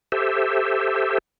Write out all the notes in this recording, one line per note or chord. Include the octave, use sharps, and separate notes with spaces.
G4 A4 C5 E5